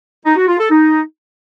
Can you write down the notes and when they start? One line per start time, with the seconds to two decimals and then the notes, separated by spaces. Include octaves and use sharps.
0.24 D#4
0.36 F#4
0.47 F4
0.59 A4
0.70 D#4